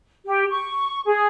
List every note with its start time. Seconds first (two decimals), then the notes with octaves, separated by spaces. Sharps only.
0.25 G4
0.49 C#6
1.05 G#4